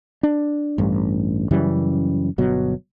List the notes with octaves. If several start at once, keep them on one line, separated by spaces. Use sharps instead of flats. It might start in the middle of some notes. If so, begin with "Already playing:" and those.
D4
A1 G2
F#2 C#3 E3 G3
G1 B2 F#3